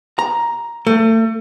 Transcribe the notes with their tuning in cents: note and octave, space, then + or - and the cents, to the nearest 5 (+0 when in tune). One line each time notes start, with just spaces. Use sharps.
A#5 +10
A3 +35